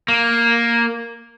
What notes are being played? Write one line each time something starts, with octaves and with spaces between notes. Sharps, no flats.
A#3